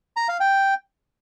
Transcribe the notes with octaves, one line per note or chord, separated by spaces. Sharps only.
A#5
F5
G5